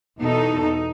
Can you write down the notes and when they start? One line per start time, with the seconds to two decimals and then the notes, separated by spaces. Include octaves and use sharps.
0.20 E2 B2 D#4 A4
0.61 D#4